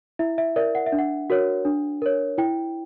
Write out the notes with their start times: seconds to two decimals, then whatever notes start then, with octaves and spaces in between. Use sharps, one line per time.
0.19 E4 E5
0.38 E5
0.56 A#4 D5 E5
0.75 F#5
0.86 E5
0.92 D4
0.99 F#5
1.30 F#4 A#4 C#5
1.65 D4
2.02 A#4 C#5
2.38 E4 G5